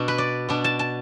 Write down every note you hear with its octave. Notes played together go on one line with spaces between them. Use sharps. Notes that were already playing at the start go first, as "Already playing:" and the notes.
Already playing: B2 B3 D4
B4
D5
B2 B3 D4
A5
A5